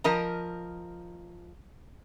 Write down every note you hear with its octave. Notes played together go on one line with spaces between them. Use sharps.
F3 A#4 D#5 A#5